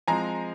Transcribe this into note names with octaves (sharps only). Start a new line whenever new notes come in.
F3 G#3 C4 G#5 A#5